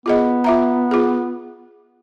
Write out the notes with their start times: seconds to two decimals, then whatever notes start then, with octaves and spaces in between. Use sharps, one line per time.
0.06 B3 F4 G#4 D#5
0.44 F4 E5 A#5
0.91 F4 G#4